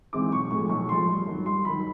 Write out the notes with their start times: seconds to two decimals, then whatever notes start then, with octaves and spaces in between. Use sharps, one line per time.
0.13 G#2 E3 G#3 C4 D6
0.32 B1 C#6
0.51 A2 F3 G#3 C#6
0.69 B1 C#6
0.89 A2 F3 G#3 C6
1.08 G2
1.27 D#3 F#3
1.46 G2 C6
1.65 D#3 F#3 B5